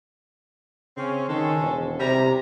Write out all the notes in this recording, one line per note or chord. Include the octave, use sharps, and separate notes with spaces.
C#3 C4 C#4
D#3 G#3 C#4 A4
E1
C3 G3 A#5